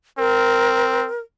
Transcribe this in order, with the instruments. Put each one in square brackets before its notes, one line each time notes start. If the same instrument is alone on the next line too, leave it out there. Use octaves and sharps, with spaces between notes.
[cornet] C4 [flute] A#4